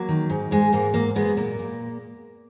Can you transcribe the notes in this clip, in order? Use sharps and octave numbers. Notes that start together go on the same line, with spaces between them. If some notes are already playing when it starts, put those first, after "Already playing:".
Already playing: F#3 A#3
D#3
G#2
G#2 G#3
G#2 A#3
F#3 A#3
F#3 G#3 B3
A#2 A#3
A#2